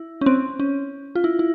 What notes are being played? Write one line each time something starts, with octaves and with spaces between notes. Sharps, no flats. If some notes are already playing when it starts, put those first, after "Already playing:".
Already playing: E4
C#4
C4
C#4
F4
E4
E4